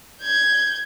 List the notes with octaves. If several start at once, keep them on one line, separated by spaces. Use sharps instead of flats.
G6 G#6